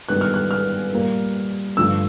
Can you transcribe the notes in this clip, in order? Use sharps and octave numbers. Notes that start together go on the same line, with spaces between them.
G#2 D#3 G3 B3 D4 F#6
F6
F#6
F6
A#2 G3 A#3
G2 D3 F3 A3 E6